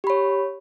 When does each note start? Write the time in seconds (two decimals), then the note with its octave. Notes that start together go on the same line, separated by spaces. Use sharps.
0.04 G4
0.07 B5
0.10 C#5